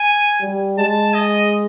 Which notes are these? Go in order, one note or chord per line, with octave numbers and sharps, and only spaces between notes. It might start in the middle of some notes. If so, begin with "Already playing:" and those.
Already playing: G#5
G3
G#3 A5
D#5